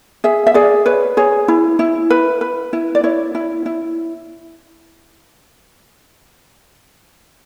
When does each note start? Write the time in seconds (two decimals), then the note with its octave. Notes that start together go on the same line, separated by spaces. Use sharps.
0.24 G#4 E5
0.47 E5
0.54 G#4 D5
0.86 B4 C#5
1.17 G#4 C#5
1.48 E4
1.79 E4
2.10 B4
2.41 B4
2.73 E4
2.95 D5
3.04 E4 C#5
3.35 E4
3.66 E4